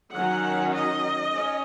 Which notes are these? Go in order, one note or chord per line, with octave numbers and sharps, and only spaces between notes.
D#3 F#3 C#4 F#5
D#5
C#4